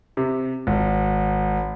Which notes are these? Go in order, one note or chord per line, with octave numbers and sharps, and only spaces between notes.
C3
G#1